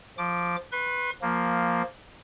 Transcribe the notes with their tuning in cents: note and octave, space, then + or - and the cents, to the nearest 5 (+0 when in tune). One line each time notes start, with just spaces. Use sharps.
F3 +0 D6 +0
B4 +0 C6 +35
F3 +0 A#3 +0